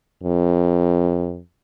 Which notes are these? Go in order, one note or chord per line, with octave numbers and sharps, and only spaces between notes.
F2